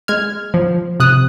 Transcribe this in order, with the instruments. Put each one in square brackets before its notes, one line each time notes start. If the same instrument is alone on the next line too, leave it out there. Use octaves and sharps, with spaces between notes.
[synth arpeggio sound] G#3 F6 G#6
F3
C3 D#6 F#6